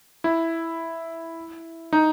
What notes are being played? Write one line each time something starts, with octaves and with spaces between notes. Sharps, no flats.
E4
D#4